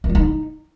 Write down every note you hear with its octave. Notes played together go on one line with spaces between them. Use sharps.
C#4
G3
D#4